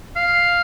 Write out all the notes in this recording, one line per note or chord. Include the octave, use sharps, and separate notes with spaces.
F5